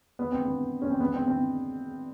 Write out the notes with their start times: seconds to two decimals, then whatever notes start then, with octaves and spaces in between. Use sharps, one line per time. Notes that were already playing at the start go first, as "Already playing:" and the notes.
0.19 B3
0.32 C4
0.46 B3
0.82 C#4
0.91 C4
1.00 B3
1.13 C4
1.28 C4